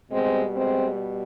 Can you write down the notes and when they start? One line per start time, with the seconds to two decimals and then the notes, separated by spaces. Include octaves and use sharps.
0.12 B2 G3 G#3 C4
0.56 G#3 C4